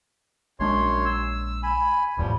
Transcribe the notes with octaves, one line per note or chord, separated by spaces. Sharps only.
A#1 F#2 G#3 D4 C#5 C6
E6
G#5 B5
D1 E2 A2 F3 G3